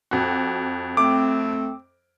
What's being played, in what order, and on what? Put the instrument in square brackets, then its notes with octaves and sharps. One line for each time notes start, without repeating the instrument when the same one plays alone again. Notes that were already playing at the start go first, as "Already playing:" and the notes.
[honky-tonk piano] F2 F#4
[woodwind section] A3 C4 [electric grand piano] D6